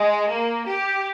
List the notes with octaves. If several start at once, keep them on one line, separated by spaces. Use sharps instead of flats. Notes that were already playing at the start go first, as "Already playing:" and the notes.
Already playing: G#3
A#3
G4